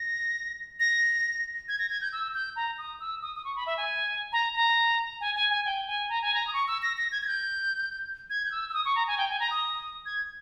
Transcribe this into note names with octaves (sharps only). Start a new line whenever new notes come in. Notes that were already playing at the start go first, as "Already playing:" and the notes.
Already playing: A#6
A#6
G#6
A#6
G#6
G6
E6
G6
A#5
D#6
E6
D#6
D#6
C#6
B5
E5
G#5
A#5
A#5
G#5
G#5
G#5
G5
G#5
A#5
G#5
A#5
D#6
C#6
E6
A#6
A#6
G#6
G#6
G6
G#6
G6
E6
E6
D#6
C#6
A#5
G#5
G5
G#5
A#5
D#6
G#6